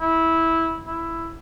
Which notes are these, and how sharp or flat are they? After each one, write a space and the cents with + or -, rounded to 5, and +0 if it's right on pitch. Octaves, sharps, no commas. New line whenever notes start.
E4 -15
E4 +5